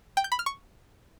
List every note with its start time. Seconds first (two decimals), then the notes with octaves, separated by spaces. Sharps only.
0.17 G5
0.24 G6
0.32 B5
0.39 F6
0.46 C#6